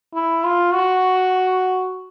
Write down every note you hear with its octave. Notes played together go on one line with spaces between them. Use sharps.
E4
F4
F#4